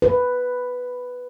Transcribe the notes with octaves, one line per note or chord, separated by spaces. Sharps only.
B4